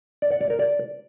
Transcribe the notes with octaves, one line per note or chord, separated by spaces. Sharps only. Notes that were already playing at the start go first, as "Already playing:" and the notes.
D5
F#5
D5
A#4
D5